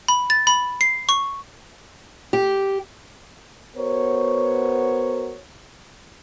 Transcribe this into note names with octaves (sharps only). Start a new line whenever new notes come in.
B5
A6
B5
C7
C#6
G4
B3 F#4 A#4 C5 C#5